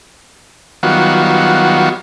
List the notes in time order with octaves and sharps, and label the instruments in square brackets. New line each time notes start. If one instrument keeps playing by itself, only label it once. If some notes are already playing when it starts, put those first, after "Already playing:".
[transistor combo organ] D#3 F#3 G3 B3 F4 F#4